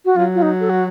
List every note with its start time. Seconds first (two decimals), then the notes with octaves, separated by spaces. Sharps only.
0.05 F#4
0.16 F#3 F4
0.35 F4
0.42 D#4
0.61 A4
0.70 F#4